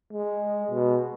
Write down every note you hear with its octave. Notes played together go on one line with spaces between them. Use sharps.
G#3
B2